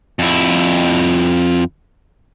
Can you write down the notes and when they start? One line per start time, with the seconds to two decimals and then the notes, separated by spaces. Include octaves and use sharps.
0.19 F2 E4